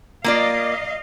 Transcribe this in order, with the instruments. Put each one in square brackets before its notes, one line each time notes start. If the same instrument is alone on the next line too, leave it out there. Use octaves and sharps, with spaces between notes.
[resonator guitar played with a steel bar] A#3 F4 D5 [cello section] D#5 F5